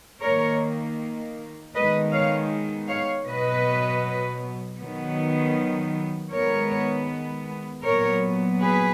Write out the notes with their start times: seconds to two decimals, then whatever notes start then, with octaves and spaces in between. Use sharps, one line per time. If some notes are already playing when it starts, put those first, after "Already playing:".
0.21 D#3 A#3 A#4 C#5
1.74 D#3 G#3 B3 B4 D#5
2.12 C#5 F5
2.89 C#5 F5
3.27 B2 F#3 B3 B4 D#5
4.80 D#3 F#3 B3
6.31 D#3 G#3 B3 A#4 C#5
7.84 A#2 F#3 B3 A#4 C#5
8.61 G#4 B4